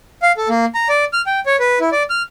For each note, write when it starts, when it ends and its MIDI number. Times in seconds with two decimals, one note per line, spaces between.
0.22 0.32 77
0.37 0.48 69
0.49 0.65 58
0.75 0.88 82
0.89 1.05 74
1.13 1.21 89
1.27 1.40 79
1.46 1.56 73
1.59 1.79 71
1.80 1.90 64
1.92 2.03 74
2.10 2.22 89